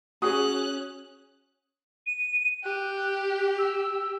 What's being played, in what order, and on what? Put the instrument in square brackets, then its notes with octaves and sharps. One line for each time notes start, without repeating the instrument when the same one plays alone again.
[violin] C#4 F#6 [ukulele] F#4 G#4 [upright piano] D#6
[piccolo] D#7
[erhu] G4 [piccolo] F#6
[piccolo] E6